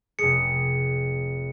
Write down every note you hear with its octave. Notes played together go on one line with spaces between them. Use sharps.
F1 G#4 C#7